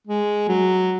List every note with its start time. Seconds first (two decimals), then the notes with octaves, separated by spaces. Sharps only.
0.07 G#3
0.49 F#3